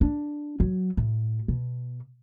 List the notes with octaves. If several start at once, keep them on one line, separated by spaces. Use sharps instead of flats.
D4
F#3
A2
B2